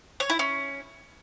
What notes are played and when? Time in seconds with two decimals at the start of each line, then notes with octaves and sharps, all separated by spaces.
0.20 C#5
0.30 E4
0.39 C#4